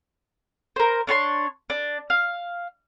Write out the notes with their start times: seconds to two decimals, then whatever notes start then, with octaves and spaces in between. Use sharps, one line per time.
0.76 A#4 C5
1.07 D4 C#5 A5 C6
1.70 D4
2.10 F5